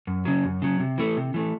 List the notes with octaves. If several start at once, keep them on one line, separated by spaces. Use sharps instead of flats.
F#2
C#3 F#3
F#2
C#3 F#3
C3
E3 A3
C3
E3 A3